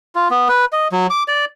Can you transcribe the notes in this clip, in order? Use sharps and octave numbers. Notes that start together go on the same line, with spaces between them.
F4
B3
B4
D#5
F#3
D6
D5